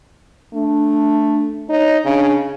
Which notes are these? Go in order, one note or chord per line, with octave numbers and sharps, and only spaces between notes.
A3 D4
D#4 C#5
C#3 D4